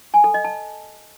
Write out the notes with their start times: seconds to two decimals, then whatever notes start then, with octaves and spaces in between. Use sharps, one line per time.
0.14 G#5
0.24 A4
0.34 D#5
0.45 A5